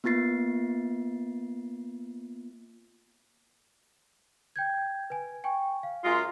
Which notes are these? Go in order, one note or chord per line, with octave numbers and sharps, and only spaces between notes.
A#3 B3 F4 A6 C7
G5 G6 G#6
B4 G#5
G5 G#5 C#6
F5
F#2 G#3 F4